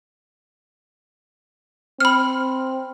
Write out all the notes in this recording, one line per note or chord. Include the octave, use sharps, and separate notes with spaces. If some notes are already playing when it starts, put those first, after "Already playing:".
C4 B5 F6